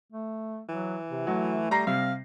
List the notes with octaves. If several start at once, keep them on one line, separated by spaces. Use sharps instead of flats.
A3
E3 F#3
C3
F#3 A3
G3 A#5 A#6 C7
C3 G3 F5